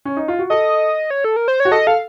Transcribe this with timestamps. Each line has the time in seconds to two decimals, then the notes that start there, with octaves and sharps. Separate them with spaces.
0.05 C#4
0.17 D#4
0.28 F4
0.39 F#4
0.50 A4 D#5
1.10 C#5
1.24 A4
1.36 A#4
1.48 C5
1.60 C#5
1.65 F#4
1.71 A4 D#5
1.87 A4 F5